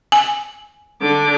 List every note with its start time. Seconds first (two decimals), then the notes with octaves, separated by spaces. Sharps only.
0.12 G#5
1.02 D3 D6